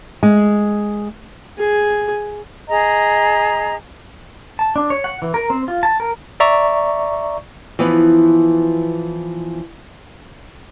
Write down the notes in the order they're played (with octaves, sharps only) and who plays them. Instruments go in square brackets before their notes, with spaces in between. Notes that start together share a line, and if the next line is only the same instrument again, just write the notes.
[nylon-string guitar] G#3
[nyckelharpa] G#4
[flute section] G#4 D#5 A#5
[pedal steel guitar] A5
D4
C#5
F#5
E3
A#4
C4
F4
A5
A#4
[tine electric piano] D5 E5 A#5 C#6
[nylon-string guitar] E3 F3 B3